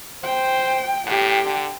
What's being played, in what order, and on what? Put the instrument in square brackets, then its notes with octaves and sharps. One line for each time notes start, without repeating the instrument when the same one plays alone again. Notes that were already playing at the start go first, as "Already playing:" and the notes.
[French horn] C5 [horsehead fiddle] G5
[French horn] A2 [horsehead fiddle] G4 G5
[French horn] D3